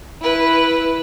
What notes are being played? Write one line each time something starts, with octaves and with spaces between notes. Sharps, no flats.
E4 B4